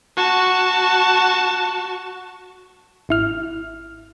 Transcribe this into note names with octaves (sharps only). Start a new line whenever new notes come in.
F#4 A5
G#1 E4 F6